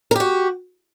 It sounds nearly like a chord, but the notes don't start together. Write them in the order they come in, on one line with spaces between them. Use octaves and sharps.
A#4 G4 F#4